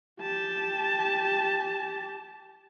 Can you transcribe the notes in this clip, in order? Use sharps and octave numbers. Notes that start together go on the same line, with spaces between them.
G4 A5